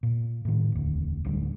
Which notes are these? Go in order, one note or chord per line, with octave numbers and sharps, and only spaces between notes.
A#2
A2 D#3
E1 D2
D1 D2 G3